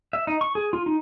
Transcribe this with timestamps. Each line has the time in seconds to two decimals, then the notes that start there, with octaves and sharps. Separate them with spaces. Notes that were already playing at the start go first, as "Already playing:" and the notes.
0.13 E5
0.27 D#4
0.41 C#6
0.55 G#4
0.73 F4
0.86 D#4